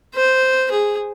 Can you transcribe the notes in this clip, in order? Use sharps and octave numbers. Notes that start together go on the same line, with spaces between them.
C5
G#4